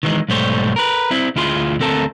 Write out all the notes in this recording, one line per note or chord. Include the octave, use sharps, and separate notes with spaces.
D#3 E3 G#3
B1 G#2 G3 A3 C5 C#5
A#4 B4
C4 E4
D2 E4 F4 G#4 C6
D2 C4 A4 A#4 A5